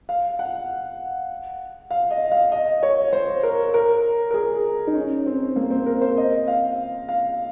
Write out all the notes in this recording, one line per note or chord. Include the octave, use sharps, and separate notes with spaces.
F5
F#5
F5
D#5
F5
D#5
C#5
C5
A#4
A#4
A#4
G#4
D#4
C#4
C4
A#3
C4
A#4
C5
D#5
F5
F5